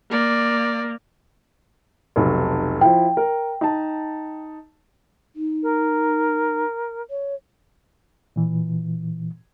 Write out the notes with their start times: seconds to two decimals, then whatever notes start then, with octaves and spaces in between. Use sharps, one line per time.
0.11 A#3 D5
2.16 F1 B1
2.81 F3 E4 G5
3.17 A#4
3.61 D#4 A5
5.36 D#4
5.63 A#4
7.10 C#5
8.36 A#2 E3